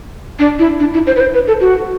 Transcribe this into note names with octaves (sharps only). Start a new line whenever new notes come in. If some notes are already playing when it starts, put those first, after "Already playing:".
D4
E4
D4
E4
C5
B4
C5
B4
A4
F#4